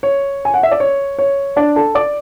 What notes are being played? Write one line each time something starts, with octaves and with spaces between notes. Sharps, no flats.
C#5
G#5
F#5
E5
D5
C#5
C#5
D4 D5
A4 A5
D5 D6